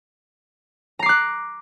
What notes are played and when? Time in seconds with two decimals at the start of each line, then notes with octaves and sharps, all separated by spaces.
0.99 A#5
1.03 C7
1.06 D6
1.09 F#6